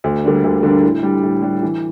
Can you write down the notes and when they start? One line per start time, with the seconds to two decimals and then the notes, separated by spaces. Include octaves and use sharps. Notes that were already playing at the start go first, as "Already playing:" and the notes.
0.04 D2
0.24 D3 G3 A#3 D4
0.44 D2
0.63 D3 G3 A#3 D4
0.83 A2
1.03 G3 D4
1.23 A2
1.42 G3 D4
1.63 E3